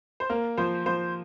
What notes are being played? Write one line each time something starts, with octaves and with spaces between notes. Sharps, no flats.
C5
A#3 A#4
F3 C5
F3 C5